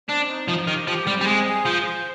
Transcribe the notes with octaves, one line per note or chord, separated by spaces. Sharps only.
C4 D4
D#4
F3 D#4
D#3 G4
F3 G4
G3 C4
G3
G#3 G#4
G#4
F3 C5
C5